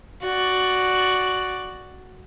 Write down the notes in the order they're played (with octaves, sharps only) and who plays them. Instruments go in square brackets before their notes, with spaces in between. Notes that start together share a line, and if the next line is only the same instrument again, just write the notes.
[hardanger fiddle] F#4 D5